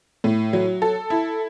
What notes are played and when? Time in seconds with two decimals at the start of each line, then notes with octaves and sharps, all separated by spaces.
0.24 A2
0.53 F#3
0.82 A4
1.10 E4